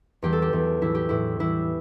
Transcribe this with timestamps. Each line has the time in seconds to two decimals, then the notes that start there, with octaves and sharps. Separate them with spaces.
0.22 E2 E3 G3 G4
0.33 A4
0.42 G4
0.53 E2 E3 G3
0.81 A2 E3 G3 E4
0.95 G4
1.09 A2 E3 G3 E4
1.39 A2 E3 G3 E4